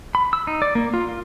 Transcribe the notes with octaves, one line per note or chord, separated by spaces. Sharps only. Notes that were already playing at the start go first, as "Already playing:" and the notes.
B5
E6
D#4
D5
A#3
F4
F4